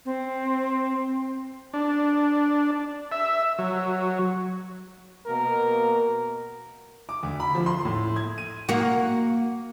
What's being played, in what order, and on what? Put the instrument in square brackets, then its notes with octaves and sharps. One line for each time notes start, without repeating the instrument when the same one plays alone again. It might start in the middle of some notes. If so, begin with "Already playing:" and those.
[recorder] C4
[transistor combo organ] D4
E5
F#3
[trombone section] B2 A#3 A#4
[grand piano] D6
D2
B5
F3
C6
A2
G#6
D#7
[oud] A#3 F#4